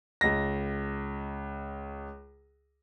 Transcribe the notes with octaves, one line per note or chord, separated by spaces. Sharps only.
C#2 A#6